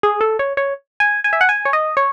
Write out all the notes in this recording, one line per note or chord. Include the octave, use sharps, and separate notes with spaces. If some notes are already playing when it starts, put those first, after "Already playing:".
G#4
A4
C#5
C#5
G#5
G#5
E5
F#5
G#5
C#5
D#5
C#5